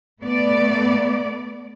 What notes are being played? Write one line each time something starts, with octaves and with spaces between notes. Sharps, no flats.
A3 B3 D5